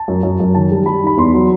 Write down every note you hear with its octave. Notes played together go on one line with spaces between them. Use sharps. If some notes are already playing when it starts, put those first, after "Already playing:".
Already playing: A5
F#2
F#2
F#2
D#3 A5
G3
G3 B5
D#4 B5
E2 C6
F#3